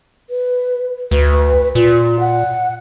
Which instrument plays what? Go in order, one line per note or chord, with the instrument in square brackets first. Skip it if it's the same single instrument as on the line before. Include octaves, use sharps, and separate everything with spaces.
[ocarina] B4
[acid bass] D2 [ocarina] B4
[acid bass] A#2 [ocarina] F4
[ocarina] F#5